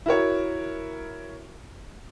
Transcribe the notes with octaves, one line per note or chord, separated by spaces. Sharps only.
E4 F#4 A#4 C#5